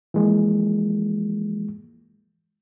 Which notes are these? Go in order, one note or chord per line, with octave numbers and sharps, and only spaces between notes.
E3 F3 G#3 A#3